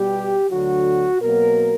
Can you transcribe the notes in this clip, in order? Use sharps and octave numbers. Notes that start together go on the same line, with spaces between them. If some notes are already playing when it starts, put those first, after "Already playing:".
Already playing: B2 G3 B3 G4
D2 D3 F#3 F#4
B2 F#3 A#3 A#4